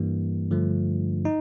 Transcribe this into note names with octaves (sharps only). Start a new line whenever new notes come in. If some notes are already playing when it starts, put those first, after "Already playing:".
Already playing: G2 E3 G3 A#3
G2 D3 F3 A3
D#4